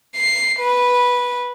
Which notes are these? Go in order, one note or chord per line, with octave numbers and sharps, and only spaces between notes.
C7
B4